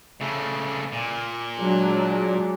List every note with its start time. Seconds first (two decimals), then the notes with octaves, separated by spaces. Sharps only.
0.21 C#3 A3
0.93 A#2
1.59 F#3 G#3 D4